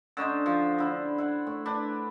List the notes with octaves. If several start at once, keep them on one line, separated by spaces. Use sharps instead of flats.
D3 C#4 D#4 C5
F3
D3 E4
E4 F#5
A2
D4 B4